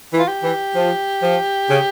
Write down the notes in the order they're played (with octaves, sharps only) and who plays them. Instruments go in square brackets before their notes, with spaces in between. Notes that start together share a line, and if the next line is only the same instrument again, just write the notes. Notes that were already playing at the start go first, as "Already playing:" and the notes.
[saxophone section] E3
[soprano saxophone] F4
G4
[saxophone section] E3
F3
F3
C#3